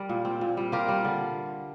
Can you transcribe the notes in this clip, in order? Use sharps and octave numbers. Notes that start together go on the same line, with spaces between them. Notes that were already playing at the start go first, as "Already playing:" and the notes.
Already playing: G3 A#4 D5
A#2
C4
A#2
G3
F4 G4 A#4
G3
D3